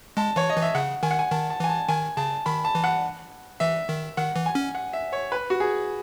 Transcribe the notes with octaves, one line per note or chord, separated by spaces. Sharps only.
G#3 A5
E3 C#5
D#5
E3
E5
C#3 F#5
D#3 G#5
F#5
G#5
D#3 A5
A5
E3 G#5
A5
D#3 G#5
C#3 A5
D#3 B5
A5
E3
F#5
E3 E5
D#3
D#3 F#5
E3
G#5
C#4
F#5
E5
C#5
B4
F#4
G#4